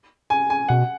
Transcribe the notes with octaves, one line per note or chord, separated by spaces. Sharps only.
G#5
G#5
B2 F#5